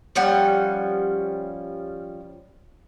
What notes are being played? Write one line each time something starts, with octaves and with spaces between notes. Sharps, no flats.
F3 G3 C#4 F#5